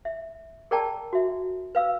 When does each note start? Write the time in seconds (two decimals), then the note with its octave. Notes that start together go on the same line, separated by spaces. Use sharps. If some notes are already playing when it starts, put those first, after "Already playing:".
0.05 E5
0.71 G#4 A#4 D5 G5 A5 A#5
1.13 F#4 E5
1.75 B4 F5 E6